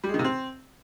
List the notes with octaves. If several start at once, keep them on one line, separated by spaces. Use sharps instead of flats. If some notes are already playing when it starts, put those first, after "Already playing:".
G3
G#3
D#3
C3
C4